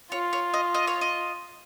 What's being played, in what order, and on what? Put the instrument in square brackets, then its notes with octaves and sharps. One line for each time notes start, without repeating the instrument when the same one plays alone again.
[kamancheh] F4 [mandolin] C#5
[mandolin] C#5
D#5
D#5
C#5
D#5